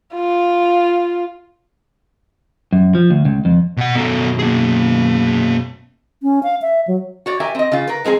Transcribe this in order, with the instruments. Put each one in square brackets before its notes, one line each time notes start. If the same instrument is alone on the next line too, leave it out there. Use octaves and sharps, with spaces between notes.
[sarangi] F4
[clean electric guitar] F#2
F3
D2
C#2
F2
[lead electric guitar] B2 F#5
[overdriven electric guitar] F#2 B2 [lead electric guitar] B3 A4
[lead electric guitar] A#3 G#4
[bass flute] C#4
F5
E5
F#3
[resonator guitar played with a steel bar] F#4 C#5 D5
G4 A#4 E5 G#5
C4 D#5
C#3 F4
A#4 B4
F3 G#3 C4 G#4